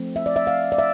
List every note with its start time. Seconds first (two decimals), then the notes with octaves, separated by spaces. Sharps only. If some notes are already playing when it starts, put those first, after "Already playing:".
Already playing: F3 A3 C4
0.16 E5
0.26 D5
0.36 E5
0.47 F5
0.72 D5
0.78 E5